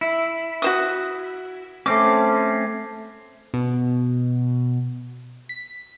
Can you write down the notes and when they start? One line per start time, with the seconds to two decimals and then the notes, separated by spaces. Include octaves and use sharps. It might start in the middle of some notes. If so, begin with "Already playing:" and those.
0.01 E4
0.62 F#4 C5 D#6
1.86 A3 C4 C#4 D6
3.54 B2
5.49 B6